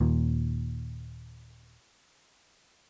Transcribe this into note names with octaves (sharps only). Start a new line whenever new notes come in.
D#1 D#2 A#2